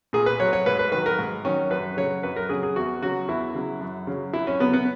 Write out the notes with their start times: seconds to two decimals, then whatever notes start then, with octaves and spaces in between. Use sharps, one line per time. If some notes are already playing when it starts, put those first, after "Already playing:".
0.13 A#2 G#4
0.26 B4
0.40 F#3 C#5
0.53 C#5
0.66 G#2 B4
0.79 B4
0.92 D#3 F#3 B4
1.06 A#4
1.19 G#2
1.45 D#3 F#3 C#4
1.71 F#2 B4
1.97 C#3 F#3 C#5
2.23 F#2 B4
2.36 A#4
2.49 C#3 F#3 G#4
2.63 G#4
2.76 E2 F#4
3.02 C#3 F#3 F#4
3.28 E2 E4
3.55 C#3 F#3
3.81 F#2
4.07 C#3 F#3
4.33 F#2 E4
4.47 C#4
4.59 C#3 F#3 B3
4.73 B3